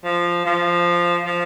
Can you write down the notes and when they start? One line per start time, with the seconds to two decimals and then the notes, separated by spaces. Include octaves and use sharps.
0.04 F3
0.45 F3
1.26 F3